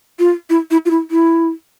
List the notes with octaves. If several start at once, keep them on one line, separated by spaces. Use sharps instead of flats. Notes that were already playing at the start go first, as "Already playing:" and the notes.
F4
E4
E4
F4
E4
E4